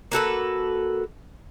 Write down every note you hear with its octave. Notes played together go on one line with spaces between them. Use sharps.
A#3 F#4 A4 B4